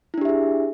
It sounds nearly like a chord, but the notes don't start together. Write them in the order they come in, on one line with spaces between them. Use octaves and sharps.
E4 D4 G4 E5 G#4